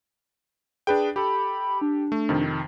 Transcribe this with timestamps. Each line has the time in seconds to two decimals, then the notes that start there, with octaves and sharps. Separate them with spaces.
0.87 D4 G#4 B4 G5
1.16 G4 A4 B5
1.81 D4
2.12 A3
2.29 F2 C3 D#3